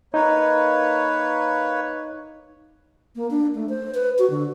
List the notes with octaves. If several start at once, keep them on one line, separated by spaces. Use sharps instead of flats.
A#3 D#4 B4 C#5
A#3
D4
A3
C5
B4
F#4
D3